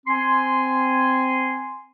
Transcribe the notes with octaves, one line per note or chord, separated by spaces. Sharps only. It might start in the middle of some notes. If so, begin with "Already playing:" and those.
C4 G#5 C6